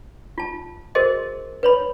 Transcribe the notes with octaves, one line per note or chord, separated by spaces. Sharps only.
F4 A5
F#4 G#4 A#4 C5 D#5
B4 C#5 B5